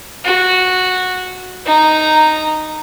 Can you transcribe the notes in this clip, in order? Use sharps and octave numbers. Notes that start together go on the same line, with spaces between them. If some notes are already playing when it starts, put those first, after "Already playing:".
F#4
D#4 A#5